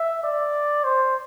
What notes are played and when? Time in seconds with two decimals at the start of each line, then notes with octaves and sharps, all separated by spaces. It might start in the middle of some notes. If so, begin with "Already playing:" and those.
Already playing: E5
0.24 D5
0.84 C5